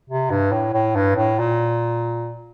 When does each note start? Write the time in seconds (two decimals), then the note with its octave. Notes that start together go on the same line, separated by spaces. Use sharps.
0.09 C3
0.31 G2
0.52 A2
0.73 A2
0.96 G2
1.16 A2
1.39 A#2